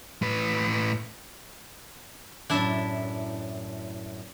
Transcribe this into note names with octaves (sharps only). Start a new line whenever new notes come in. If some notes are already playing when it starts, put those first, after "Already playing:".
A2 B4
F#2 A2 D4 E4 E5 A5